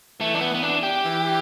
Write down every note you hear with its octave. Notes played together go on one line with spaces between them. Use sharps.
E3 A3
D4
B3
B3
D4
G4
E3